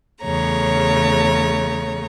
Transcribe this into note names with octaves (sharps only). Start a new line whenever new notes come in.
E2 C#3 A3 C#5 A#5